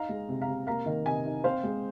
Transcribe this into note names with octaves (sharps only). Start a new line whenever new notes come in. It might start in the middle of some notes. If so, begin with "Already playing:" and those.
Already playing: D#4 F5 A#5
G#3
C3
F5 A#5
C3
A#3 F5 A#5
D#3
C3 D#5 G#5
D#4
C4 C5 F5
G#3